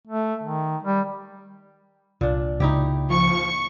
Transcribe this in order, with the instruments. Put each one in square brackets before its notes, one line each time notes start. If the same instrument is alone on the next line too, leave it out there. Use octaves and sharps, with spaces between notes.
[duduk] A3
D#3
G3
[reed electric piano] C2 [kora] A#2 D4
[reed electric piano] C#2 [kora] D#4 E4 G4
[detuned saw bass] F3 [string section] C#6